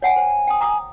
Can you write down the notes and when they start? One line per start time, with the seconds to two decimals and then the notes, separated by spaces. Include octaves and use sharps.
0.02 C#5 F#5 G#5 A5
0.16 C5
0.47 G5 A5 D#6
0.61 A#5 D6 D#6